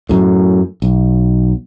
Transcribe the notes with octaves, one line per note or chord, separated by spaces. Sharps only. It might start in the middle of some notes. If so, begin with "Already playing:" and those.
F#2 A2
B1